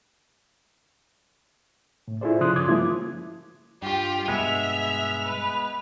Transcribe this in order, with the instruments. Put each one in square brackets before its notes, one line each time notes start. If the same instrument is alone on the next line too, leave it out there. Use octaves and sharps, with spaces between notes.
[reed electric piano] A2
E4 F4 G#4 A4 C5 D5
C#3 F3 C6 D#6 F#6
G2 C#4 D6 D#6 G#6
F3 G3 G#3 A#3 E4 F4
[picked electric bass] G2 [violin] F4 [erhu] G4
[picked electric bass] G2 B2 [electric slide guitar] G#3 B3 [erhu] E5 [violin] F7
[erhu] B4